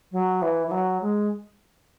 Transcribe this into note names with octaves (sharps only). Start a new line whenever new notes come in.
F#3
E3
E3
F#3
G#3